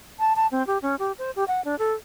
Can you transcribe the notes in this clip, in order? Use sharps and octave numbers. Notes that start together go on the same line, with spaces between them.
A5
A5
C4
G4
C#4
G4
C5
G4
F#5
D4
A4